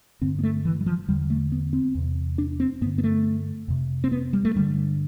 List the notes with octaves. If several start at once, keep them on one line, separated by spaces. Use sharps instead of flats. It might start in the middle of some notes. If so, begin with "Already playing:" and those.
G2 D3 C4
B3
A3
E3
G3
F3
E2 D3 G3
A3
B3
C4
E2 C3
D4
C4
G2 D3 B3
B3
A3
F2 C3
C4
B3
G3
A3
G2 D3 G3